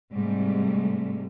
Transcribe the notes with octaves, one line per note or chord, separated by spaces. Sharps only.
G#2 C3 G3 A3